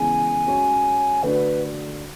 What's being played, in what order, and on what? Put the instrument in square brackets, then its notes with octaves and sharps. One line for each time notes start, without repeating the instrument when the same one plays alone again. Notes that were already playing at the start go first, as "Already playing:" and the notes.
Already playing: [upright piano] C#3 E3 G#3 B3 [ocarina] G#5
[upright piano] G#3 C#4 F#4 C#5
[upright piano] D3 A3 D4 F#4 [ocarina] B4